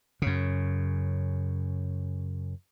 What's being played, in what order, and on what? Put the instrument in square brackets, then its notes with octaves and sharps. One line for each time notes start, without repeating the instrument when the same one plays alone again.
[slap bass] F#2 C#3